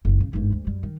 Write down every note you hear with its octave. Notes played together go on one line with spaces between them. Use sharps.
F#1 C#2
C#3
G1 G#2
D2
F#2 G3
D#3